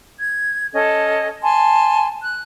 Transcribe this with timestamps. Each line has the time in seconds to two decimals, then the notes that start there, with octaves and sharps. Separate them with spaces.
0.19 G#6
0.73 C#4 A4 D#5
1.42 G#5 A5 C6
2.22 F#6